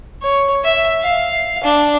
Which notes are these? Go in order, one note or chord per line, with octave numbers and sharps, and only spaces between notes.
C#5
E5
F5
D4